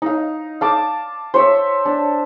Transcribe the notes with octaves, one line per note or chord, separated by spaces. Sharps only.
D#4 F5
F5 A5 D6
C5 C#5 E5
D4